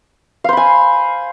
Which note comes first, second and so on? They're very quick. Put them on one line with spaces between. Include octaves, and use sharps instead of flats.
F5 C5 B5 G#5